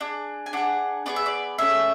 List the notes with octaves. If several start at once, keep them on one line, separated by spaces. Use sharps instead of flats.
D4 G#4
G#5
D4 G#4 F#5
B3 D4 G#4 D5
E5
D5
A3 C#4 G#4 E5